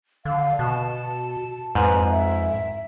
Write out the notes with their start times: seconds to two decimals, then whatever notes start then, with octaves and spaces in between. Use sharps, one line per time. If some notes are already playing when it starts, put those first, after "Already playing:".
0.25 D3 F5
0.59 B2 A5
1.75 F2 G#2 B4
2.10 E5